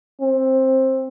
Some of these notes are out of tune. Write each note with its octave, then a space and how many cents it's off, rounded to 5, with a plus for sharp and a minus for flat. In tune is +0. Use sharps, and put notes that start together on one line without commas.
C4 +15